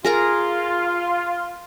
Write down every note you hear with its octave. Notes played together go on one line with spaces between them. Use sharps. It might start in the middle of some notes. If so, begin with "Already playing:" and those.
F4 G#4 A#4 A#5